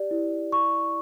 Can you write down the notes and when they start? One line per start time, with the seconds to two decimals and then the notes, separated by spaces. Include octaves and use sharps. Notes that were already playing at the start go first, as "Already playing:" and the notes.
Already playing: G4 D5
0.11 E4
0.52 C#6